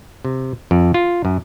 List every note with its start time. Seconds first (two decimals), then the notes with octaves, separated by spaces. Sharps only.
0.25 C3
0.71 F2
0.94 F4
1.25 F#2